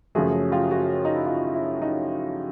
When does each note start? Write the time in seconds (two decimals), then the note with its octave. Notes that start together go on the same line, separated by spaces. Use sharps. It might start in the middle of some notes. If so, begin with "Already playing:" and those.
0.15 F#2 C#3 F3 A3 F#4 G#4
0.52 F4 G4
0.71 F#4 G#4
1.05 D#4
1.15 E4
1.26 D#4 F4
1.54 E4
1.82 D#4